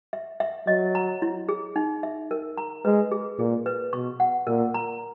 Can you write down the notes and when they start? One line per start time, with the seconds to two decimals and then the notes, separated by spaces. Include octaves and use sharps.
0.13 E5
0.40 E5
0.67 F#3 D#5
0.95 A#5
1.22 E4
1.49 G#4
1.76 D#4
2.03 E5
2.31 A#4
2.58 A#5
2.85 G#3 B4
3.12 G#4
3.39 A#2 G#4
3.66 B4
3.93 B2 C#6
4.20 F#5
4.47 A#2 A#4
4.74 A#5